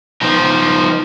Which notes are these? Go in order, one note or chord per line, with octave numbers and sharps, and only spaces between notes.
F3 D#4